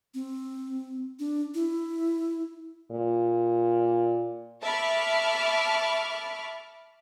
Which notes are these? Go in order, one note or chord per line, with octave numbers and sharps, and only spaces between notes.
C4
D4
E4
A#2
E5 A5 B5 C#6 D6 F6